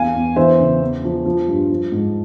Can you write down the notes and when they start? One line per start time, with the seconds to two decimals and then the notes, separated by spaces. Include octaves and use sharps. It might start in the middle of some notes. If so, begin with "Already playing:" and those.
Already playing: E2 F5 G#5
0.14 E2
0.36 E3 C5 E5
0.60 C#3
0.81 E2
1.04 F3
1.26 F3
1.48 G2
1.70 F3
1.92 G#2